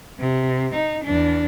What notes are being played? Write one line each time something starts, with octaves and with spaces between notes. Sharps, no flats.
C3
D#4
E2 D4